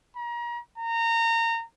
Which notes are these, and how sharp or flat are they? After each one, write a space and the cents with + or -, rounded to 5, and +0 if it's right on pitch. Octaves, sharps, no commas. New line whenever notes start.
A#5 +35
A#5 -25